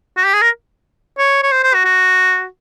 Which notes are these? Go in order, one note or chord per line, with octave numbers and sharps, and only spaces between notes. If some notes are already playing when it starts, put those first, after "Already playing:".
F#4
G4
G#4
A#4
C#5
C#5
C5
C5
F#4
F#4